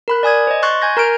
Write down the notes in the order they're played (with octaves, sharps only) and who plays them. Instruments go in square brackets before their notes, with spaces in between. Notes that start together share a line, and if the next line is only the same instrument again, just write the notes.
[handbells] A#4 B5 F#6
D5 G#5 D#6 G#6
C5 D#5
C6 C#6 F#6 A6
G#5 G6 G#6 A#6
A#4 A#5 F6 G6 D7